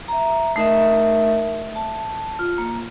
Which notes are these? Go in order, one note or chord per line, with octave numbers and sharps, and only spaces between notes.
E5 A#5
A3 D#4 A#4 D#5 E5
A5
F4
A#3